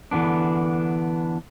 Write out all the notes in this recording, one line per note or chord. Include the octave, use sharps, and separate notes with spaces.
D3 E3 F3 B3 D4